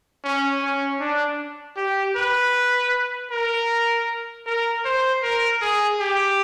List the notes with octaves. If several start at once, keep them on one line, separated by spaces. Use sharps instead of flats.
C#4
C#4
D4
G4
B4
A#4
A#4
C5
A#4
G#4
G4